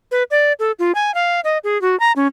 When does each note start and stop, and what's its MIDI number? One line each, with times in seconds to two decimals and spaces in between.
0.11 0.23 71
0.31 0.53 74
0.59 0.72 69
0.79 0.92 65
0.95 1.14 80
1.14 1.40 77
1.44 1.58 75
1.64 1.80 68
1.81 1.98 66
2.00 2.12 82
2.16 2.27 61